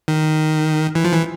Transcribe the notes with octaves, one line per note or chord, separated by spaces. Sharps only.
D#3
E3
F3
E3